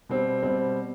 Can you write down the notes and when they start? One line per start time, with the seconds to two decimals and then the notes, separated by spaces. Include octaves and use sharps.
0.09 B2 G3 C4
0.43 B2 G3 C4